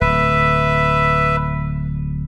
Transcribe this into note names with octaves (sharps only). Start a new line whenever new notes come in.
D1 B4 E5